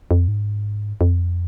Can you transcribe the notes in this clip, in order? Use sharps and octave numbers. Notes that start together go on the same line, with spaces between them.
F2
G#2
F2